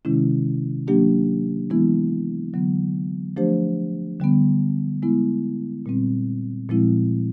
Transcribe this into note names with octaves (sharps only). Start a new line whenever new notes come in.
C3 D#3 G#3 C#4 E4
F#3 A#3 D4 G4
E3 G#3 B3 E4
D3 F#3 B3
F3 A3 D4 G4 C5
D3 G3 B3
G#3 B3 E4
A#2 G3 C4
A#2 F3 G#3 C4 E4